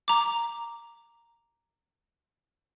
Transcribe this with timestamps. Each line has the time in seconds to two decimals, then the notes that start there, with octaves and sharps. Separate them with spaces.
0.08 A#5 D6